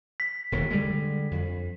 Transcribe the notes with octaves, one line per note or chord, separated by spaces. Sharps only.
B6
E1 D#2
D3 G3 G#3
F2